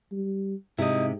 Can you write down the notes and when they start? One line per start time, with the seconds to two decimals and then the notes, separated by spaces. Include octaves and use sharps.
0.12 G3
0.78 G#2 C3 E4 D#5